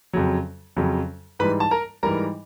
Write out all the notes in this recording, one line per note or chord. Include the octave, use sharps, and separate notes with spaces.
F2 C#3 F#3
F2 C#3 F#3
G#2 E3 G3 B4 B5
A5
A#4 A#5
G#2 E3 G3 A#4 A#5